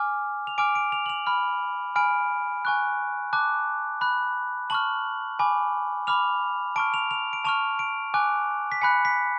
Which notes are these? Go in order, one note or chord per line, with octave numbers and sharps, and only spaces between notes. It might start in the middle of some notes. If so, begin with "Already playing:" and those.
Already playing: G#5 D6 F6
F7
G#5 D6 F6 D7
D7
F7
F#7
F7
B5 F6
G#5 B5 F6 D7
G#5 C#6 F#6
A5 D6 F#6
B5 F#6
A5 C#6 F6 F#7
G#5 B5 D6
B5 D6 F6 F7
A5 C#6 F6 D7
F7
F7
D7
A5 C#6 F6 F7
D7
G#5 D6 F#6
B6
G#5 B5 F#6 C#7
B6